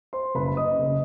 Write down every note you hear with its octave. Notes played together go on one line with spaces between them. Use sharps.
C5 C6
F#1 F#2 C#3 B4 B5
D#5 D#6
F#1 C#3